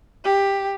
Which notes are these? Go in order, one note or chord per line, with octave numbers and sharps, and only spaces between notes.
G4